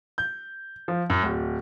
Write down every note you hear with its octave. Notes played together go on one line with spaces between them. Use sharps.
G6
F3
F#2
D1